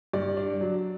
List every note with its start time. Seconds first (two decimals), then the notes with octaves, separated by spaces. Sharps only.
0.13 G2 D5
0.37 D4
0.61 F#3